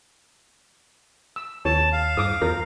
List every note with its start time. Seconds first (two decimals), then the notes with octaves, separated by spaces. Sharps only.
1.36 E6
1.65 D#2 C#5 A5
1.92 F5
2.17 G2 D6 D#6
2.42 E2 A#4